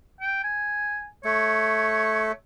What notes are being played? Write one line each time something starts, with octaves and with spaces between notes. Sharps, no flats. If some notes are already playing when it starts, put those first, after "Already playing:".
G5
G#5
A3 C#5